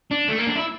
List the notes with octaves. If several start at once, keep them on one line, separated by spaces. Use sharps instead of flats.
D4
A3
A#3
D4
E4